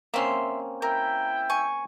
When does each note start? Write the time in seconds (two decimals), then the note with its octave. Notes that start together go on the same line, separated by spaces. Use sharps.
0.14 A#3 C4 C#4 E5 C6
0.82 E4 A#4 G5
1.50 G#5 C#6